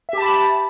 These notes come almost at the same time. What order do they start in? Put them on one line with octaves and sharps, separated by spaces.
E5 G4 A5 B5